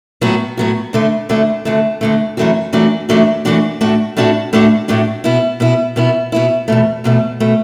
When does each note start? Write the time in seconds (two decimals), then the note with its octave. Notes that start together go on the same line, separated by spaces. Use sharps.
0.21 A2 F#3 B3 F#4
0.57 A2 F#3 B3 F#4
0.93 D2 D3 A3
1.29 D2 D3 A3
1.65 D2 D3 A3
2.01 D2 D3 A3
2.37 F#2 E3 A3 D4 F#4
2.73 F#2 E3 A3 D4 F#4
3.09 F#2 E3 A3 D4 F#4
3.45 F#2 E3 A3 D4 F#4
3.81 A2 A3 D4 F#4
4.17 A2 A3 D4 F#4
4.53 A2 A3 D4 F#4
4.88 A2 A3 D4 F#4
5.24 B2 B3 E4
5.60 B2 B3 E4
5.96 B2 B3 E4
6.32 B2 B3 E4
6.68 E2 B2 A3
7.04 E2 B2 A3
7.40 B2 A3